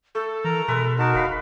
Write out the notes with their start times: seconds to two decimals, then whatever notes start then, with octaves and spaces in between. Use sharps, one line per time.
0.15 A3 A4
0.44 E3 A#4 A#5
0.68 B2 G#3 A4 B4 E5
0.98 D#4 F#4 A#4 A5
1.15 F1 B4 F5 B5